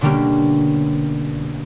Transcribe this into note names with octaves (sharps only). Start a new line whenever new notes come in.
B2 D3 G3 A#3 C#4 G4